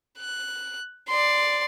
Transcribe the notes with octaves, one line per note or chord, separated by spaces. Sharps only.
F#6
D5 C6